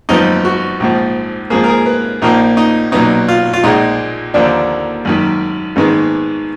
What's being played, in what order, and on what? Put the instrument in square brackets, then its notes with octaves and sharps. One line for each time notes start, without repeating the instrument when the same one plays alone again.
[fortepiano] G#1 F#2 F3 B3 D#4
F#4
A#1 G#2 F3
G#2 F3 A#3 G#4
A#4
G#4
B4
A#1 A#2 F3 A#3 D#4
D#4
B1 A#2 F#3 B3 D#4
F4
F4
A#1 A#2 G#3 D#4
D#2 D3 F3 A#3 D4
G#1 F#2 D#3
G#1 G#2 D#3 G#3 B3